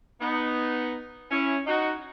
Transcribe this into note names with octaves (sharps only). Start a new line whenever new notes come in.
B3 D#4
C#4 E4
D#4 F#4